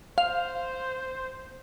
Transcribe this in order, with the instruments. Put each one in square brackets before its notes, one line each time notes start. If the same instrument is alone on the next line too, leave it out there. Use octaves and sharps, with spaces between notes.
[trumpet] C5 [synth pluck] F5